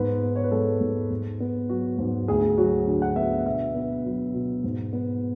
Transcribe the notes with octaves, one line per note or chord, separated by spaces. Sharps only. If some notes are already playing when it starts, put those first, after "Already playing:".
Already playing: G#2 B3 B4
B3
C#5
B4
G#3 A4
G#2
G#2
B3
F#3 F#4
G#2
D2 G#4
F#3 F#4
D3
F#5
B3 E5
B2 E5
B3
F#3
B2
G#2
B3